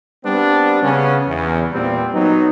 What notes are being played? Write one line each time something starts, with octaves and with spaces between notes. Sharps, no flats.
G3 B3 C4 D4
C#3 B3 C#4
E2
A#2 G3 B3 C4
F#3 B3 D#4